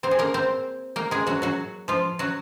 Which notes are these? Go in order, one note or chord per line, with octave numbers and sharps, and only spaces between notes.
C4 C5
G#4
A#3 A#4
C4 C5
A#3 A#4
G#3 G#4
F#3 F#4
F#3 F#4
F3 F4
F#3 F#4